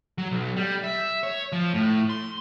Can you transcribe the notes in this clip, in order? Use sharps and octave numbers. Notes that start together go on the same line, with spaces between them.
F#3
B1
G3
E5
C#5
F3
A2
C6